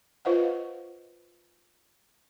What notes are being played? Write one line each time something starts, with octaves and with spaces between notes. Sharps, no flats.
F4 B4 C5 D#5 F5 F#5